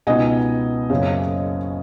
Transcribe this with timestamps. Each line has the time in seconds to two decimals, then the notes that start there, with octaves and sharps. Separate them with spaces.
0.07 C#2 B2 B3 D#4 D#5 G#5
0.90 F#1 F#2 C#3